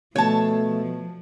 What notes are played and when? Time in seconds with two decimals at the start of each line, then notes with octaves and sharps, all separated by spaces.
0.16 B2 F3 A3 C#5 A5